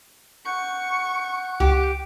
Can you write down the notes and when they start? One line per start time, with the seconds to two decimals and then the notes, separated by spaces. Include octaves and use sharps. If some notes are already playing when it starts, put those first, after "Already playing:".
0.45 F#5 C#6 F#6 G6
1.60 C#2 G4